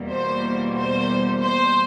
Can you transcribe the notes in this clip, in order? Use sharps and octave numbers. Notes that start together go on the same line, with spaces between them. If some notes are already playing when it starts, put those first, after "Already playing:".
Already playing: E2 B2 G3 A#3
C5
C5
C5